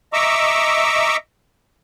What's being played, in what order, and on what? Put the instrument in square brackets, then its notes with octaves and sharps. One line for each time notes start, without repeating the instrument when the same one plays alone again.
[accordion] D#5 E5 A#5 C#6 D6 E6